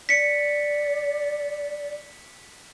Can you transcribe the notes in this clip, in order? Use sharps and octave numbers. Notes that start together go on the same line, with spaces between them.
D5 B6 C#7